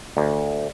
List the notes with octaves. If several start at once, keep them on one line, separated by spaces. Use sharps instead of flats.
D2